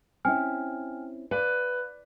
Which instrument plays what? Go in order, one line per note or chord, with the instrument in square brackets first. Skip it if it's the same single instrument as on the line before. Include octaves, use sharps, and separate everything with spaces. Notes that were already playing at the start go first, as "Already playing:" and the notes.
[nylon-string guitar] C4 C#4 E4 [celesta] G5 G#5 F6
[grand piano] B4 [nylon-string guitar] D5 [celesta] F5